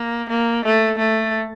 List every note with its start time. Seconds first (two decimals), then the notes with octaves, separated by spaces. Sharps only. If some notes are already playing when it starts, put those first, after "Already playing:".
Already playing: A#3
0.29 A#3
0.65 A3
0.98 A3